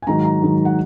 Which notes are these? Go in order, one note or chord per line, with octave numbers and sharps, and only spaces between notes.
G#5
G#2 D#3 F#3 A#5
A#5
G#2 D#3 F#3
F#5